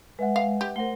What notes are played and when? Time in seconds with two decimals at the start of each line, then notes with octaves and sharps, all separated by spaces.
0.19 G#3 B4 E5 F#5
0.36 F5
0.61 G4
0.76 A3 A#4 C5 F#5 G7